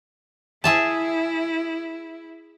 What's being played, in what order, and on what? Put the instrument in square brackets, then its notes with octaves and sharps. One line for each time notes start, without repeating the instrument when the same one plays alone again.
[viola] E4 [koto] G#4 E5 A5